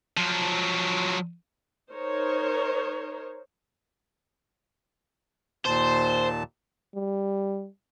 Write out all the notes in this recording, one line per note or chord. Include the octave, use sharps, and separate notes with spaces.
F3 F#3
D#4 A#4 C5 C#5
D#2 A#2 C5 A5
G3